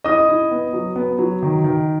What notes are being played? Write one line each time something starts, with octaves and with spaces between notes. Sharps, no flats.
E4 D#5 D#6
E4
B3
F#3
B3
F#3
D#3
D#3